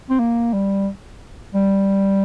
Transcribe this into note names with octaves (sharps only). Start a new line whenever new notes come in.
C4
A#3
G3
G3